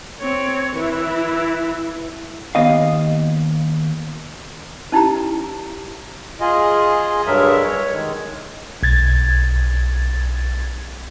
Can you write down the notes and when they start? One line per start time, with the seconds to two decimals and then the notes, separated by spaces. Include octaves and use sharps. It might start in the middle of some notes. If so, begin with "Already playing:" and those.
0.21 C4 C#5
0.75 E3 E4
2.55 D#2 B3 D#5 F5
4.92 C#4 D#4 E4 G4 A#5
6.41 F4 G#4 D#5
7.27 G2 F#3 G#3 A#4 E5
7.63 C#5
7.93 D#3 G#3
8.83 B1 G#6 A6